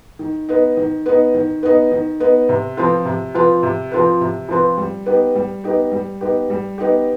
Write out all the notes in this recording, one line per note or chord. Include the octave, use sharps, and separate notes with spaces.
D#3
B3 D#4
D#3
B3 D#4
D#3
B3 D#4
D#3
B3 D#4
C3
F3 C4 F4 B4
C3
F3 C4 F4 B4
C3
F3 C4 F4 B4
C3
F3 C4 F4 B4
G3
B3 D#4 G4
G3
B3 D#4 G4
G3
B3 D#4 G4
G3
B3 D#4 G4